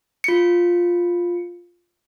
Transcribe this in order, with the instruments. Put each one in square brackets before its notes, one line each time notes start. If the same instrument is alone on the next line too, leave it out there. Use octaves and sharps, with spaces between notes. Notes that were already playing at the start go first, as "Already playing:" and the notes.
[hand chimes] F4 C#7